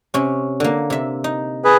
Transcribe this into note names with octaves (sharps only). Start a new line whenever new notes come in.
C3 C#4
D3 A#3
C3 E5
D#4
G#4 B4